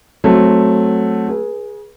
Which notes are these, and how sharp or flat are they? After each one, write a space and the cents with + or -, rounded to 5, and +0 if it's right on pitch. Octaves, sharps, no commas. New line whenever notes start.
F#3 +0 A3 +0 C4 +10
G#4 +0 B4 -40